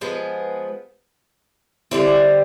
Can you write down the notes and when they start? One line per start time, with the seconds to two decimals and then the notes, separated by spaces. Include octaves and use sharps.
0.01 F3 G#3 B3
1.91 D3 G3 C4 E4